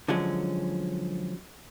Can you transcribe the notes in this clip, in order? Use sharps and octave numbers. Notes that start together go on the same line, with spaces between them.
D3 F3 F#3 G#3 C#4